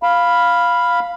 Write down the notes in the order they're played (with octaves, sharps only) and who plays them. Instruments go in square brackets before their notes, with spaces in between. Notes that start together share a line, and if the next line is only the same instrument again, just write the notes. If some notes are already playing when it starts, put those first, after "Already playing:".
[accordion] F5 B5